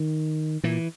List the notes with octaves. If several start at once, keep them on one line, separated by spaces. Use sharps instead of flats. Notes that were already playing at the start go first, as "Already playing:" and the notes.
Already playing: D#3
A#2 E3